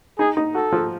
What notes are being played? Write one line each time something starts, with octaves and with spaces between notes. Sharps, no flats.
D#4 G#4
D#4
F#4 A4
F3